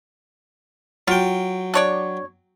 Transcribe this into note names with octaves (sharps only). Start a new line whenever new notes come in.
F#3 F4 G5
D4 C#5 D5